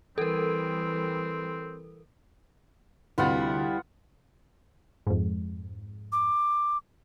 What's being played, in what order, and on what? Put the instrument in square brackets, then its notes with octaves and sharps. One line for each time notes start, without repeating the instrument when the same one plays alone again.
[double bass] E3 G3 [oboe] C4 [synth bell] A4 A#4
[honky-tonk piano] D2 C3 [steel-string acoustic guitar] G3 E4 [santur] B3 F4 F#5
[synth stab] F2 G#2
[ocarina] D6